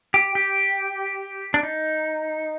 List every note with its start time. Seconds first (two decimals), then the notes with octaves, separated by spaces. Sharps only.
0.14 G4
0.35 G4
1.54 D4
1.63 D#4